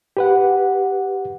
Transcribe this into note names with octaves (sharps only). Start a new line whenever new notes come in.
G4 B4 F#5